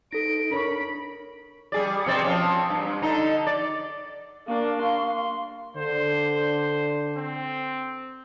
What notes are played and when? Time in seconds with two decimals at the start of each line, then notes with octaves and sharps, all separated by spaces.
0.12 D#4 A4 A#6 D7
0.51 D4 A#4 C#5 B5 C#6
1.72 G3 G#4 D5
2.06 B2 C4 D5
2.24 F3 C4 C#4
2.70 G2
3.02 D3 D#4
3.47 D5
4.46 A#3 D4 F5 C#6
4.81 C6
5.77 D3 C5
7.16 C4